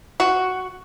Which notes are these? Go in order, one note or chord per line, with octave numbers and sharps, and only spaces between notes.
F#4